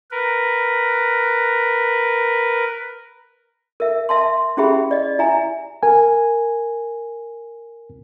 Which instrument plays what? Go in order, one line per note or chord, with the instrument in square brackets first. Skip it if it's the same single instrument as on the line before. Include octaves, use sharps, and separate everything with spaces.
[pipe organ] A#4 B4
[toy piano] A#4 E5
E5 A5 C6
C#4 E4 G4 G#4 E5 B5
D5 D#5
E4 E5 G#5 A#5
[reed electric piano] A#4 G#5